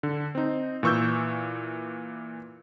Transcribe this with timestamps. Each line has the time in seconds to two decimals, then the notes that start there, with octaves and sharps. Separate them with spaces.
0.03 D3
0.35 C4 D#4
0.83 A#2 E3 C#6 E6 G6